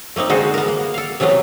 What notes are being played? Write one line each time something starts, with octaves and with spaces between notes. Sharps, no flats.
A3 A#3 C4 D#4
D3 G#3 F#4 A4 C5
B3 A#4
A#3
A4 F5
C3 E3 F#3 A3 B3